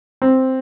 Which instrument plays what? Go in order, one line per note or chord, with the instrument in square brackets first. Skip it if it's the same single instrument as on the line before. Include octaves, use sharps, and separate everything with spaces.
[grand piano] C4